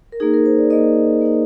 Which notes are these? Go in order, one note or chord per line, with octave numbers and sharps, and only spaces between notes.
A#4
A#3 D#4 G#4
A#4
C5
D5
A#3 D#4 D#5
A#3 D#4